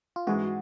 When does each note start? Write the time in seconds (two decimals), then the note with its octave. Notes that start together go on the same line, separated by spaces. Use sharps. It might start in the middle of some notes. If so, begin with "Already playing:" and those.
0.16 F4
0.27 G#2 E3 G#3 F#4